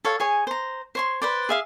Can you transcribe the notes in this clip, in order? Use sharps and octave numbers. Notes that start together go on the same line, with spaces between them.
A4 C#5 F5
G#4 C#5 G#5
C5 A#5
C5 C#5 C6
B4 C5 D5
G#4 E5 F5